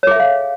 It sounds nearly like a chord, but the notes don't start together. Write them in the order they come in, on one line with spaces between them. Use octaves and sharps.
C#5 G#4 E5 A4 F5